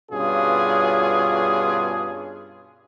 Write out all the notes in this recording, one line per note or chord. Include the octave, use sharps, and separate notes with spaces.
G2 B2 C#4 F4 G#4